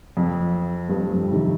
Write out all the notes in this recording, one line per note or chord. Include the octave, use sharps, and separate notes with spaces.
F2
G2
F2
F2
C3 D#3